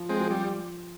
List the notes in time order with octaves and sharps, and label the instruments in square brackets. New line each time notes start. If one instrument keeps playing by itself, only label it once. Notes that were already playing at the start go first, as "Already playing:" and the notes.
Already playing: [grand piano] F3
[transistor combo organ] G#3 C4
[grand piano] F3
[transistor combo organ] G3